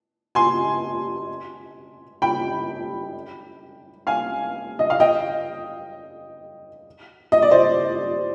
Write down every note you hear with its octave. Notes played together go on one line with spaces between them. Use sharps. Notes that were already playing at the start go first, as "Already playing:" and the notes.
G#5 C6
G5 B5
F5 G#5
D#5
F5
D#5 G5
D#5
D5
C5 D#5